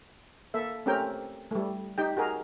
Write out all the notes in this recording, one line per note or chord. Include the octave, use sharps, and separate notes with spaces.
A#3 A4 E5
A3 C4 C#4 G4 A#4 G5
G3 A3
D#4 G4 G5
F#4 G#4 A#4